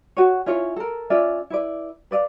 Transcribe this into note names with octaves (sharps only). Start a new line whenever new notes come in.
F#4 C#5
C#4 E4 F4 C#5
A4 A#4
C#4 F4 D5 E5
E4 B4 D5
B4 D5 D#5 F5